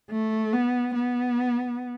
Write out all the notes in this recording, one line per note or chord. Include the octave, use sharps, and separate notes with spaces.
A3
B3
B3